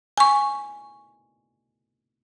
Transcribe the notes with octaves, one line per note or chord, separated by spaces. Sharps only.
G#5 C#6